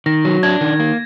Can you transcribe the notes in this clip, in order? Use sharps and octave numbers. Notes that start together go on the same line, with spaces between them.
D#3 A#6
F#3
D4 G#6
D#3
A#3